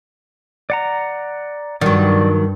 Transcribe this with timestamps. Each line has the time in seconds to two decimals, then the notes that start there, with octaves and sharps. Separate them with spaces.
0.70 D5 F#5 A#5
1.81 G2 D#3 F#3 D5